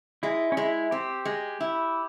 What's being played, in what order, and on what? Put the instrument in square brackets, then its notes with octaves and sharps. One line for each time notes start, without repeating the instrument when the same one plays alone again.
[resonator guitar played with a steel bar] G#3 [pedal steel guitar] E4
[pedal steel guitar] C#4
[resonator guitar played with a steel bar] G#3 [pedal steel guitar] E4
[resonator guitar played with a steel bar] C4 [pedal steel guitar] G4
[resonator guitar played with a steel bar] G#3
E4